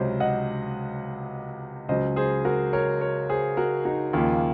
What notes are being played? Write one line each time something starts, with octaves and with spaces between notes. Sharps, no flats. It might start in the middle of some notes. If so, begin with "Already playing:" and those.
Already playing: C#2 C3 F#3 C5 C#5 D#5
D#5 F#5
C#2 C#3 F#3 C5 D#5
G#4 C5
F#4 A#4
A#4 C#5
A#4 C#5
G#4 C5
F#4 A#4
D#4 F#4
D#2 C#3 F3 A#3 F4